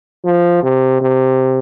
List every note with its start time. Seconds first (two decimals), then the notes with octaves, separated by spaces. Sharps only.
0.25 F3
0.63 C3
1.01 C3